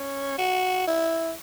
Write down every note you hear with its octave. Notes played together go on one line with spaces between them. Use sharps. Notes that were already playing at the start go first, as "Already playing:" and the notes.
Already playing: C#4
F#4
E4